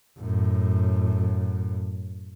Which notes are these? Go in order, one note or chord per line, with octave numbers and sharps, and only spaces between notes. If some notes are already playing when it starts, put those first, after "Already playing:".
F#2 A2